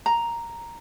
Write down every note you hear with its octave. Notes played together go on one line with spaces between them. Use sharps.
A#5